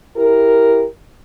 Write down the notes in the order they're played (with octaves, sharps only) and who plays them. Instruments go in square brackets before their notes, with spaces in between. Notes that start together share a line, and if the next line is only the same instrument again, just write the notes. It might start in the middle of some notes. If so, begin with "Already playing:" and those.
[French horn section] E4 G4 A#4